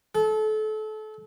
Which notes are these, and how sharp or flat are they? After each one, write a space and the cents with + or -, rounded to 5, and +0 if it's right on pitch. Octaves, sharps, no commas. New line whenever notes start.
A4 -30